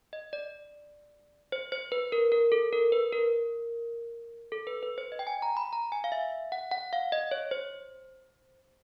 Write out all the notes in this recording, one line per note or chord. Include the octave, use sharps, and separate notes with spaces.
D#5
D5
C5
C5
B4
A#4
A#4
A4
A#4
B4
A#4
A4
B4
B4
C5
D#5
G5
G#5
A#5
B5
A#5
G#5
F5
E5
F#5
F#5
F5
D#5
C#5
C5